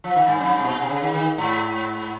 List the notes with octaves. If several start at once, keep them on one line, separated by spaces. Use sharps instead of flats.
F3
D#3
G2
F2
G2
C3
A#2
C3
C#3
D#3
D#3
G#2